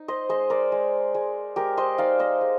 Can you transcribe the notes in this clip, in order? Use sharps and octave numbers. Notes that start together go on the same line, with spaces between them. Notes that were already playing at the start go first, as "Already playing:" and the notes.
Already playing: D#4
C5 D#5
G#3 C5 D#5
A#4 D5
G#3
G#3
G#3 G4 A#4
C5 D#5
D#4 D5 F5
C5 D#5
G#3